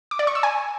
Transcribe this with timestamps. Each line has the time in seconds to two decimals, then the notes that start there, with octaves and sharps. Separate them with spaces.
0.11 D6
0.19 D5
0.27 C#6
0.35 E6
0.43 G#5